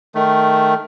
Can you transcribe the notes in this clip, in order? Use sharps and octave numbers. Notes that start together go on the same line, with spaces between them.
D#3 A3